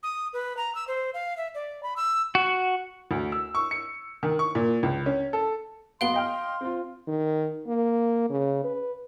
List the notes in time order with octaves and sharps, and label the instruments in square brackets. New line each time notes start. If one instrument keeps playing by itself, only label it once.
[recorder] D#6
B4
A#5
E6
C5
F5
E5
D5
B5
E6
[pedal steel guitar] F#4
[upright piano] D2
E6
C#6
C#7
D#3
C#6
A#2
C#2
C#4
A4
[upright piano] B1 B3 D7 [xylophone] F5 G7 [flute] C6
[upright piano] D#5 G5 F6
C4 F4
[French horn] D#3
A#3
C#3
B4